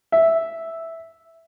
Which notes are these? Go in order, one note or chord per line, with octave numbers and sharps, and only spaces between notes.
E5